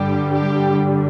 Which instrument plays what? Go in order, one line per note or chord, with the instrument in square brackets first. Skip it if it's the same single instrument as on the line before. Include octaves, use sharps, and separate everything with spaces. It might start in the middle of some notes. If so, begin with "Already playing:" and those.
Already playing: [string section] G2 D3 G3 G4
G4